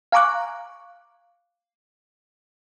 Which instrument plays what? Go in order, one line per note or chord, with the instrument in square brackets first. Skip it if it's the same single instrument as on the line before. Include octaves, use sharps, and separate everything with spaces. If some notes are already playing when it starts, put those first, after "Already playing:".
[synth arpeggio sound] F5 G#5 A#5 C#6 D6 F#6